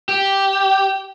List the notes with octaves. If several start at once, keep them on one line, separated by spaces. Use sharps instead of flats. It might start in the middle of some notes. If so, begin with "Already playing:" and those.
G4